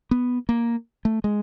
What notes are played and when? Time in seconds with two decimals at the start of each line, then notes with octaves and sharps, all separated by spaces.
0.11 B3
0.49 A#3
1.05 A3
1.24 G#3